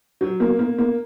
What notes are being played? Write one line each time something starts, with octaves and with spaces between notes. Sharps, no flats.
F#3
A#3
A#3
A#3